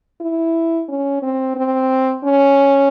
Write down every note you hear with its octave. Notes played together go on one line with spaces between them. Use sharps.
E4
C#4
C4
C4
C#4